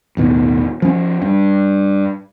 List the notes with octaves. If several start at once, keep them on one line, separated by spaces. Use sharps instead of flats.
A1 D#2 B2
F3 C#4
G2